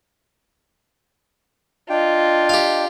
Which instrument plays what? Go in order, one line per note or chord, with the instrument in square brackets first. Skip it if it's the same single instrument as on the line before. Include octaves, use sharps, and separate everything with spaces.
[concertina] D4 G5 [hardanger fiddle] F4 [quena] D#5
[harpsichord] G4 F5